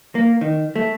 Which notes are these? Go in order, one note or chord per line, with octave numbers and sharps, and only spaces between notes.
A#3
D#3
A3